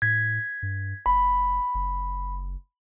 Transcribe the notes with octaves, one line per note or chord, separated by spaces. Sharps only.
A2 G#6 B6
G2
F#1 B5
F#1